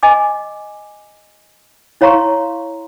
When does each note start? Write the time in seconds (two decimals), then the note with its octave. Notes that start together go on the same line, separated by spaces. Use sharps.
0.03 D#5 G#5 D6
2.01 E4 C#5 F5 A#5 C6 C#6